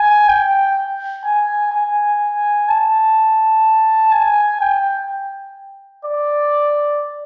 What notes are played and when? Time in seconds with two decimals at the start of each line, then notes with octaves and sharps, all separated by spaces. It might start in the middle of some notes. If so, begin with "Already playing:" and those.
Already playing: G#5
0.28 G5
1.24 G#5
1.72 G#5
2.69 A5
4.12 G#5
4.61 G5
6.05 D5